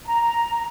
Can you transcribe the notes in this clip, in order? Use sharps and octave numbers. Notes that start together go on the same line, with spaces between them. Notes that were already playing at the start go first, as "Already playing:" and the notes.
A#5